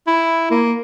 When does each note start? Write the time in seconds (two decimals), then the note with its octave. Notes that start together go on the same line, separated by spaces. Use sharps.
0.07 E4
0.51 A#3